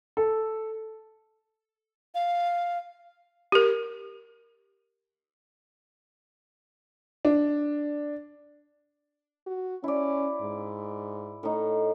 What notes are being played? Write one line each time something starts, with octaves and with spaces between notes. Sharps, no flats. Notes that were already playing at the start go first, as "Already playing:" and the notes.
A4
F5
G4 A#4
D4
F#4
C#4 E4 D5
G#2
A2 D#4